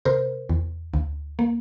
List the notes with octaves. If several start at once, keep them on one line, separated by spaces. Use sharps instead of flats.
C3 A#4 C5
E2
D2
A#3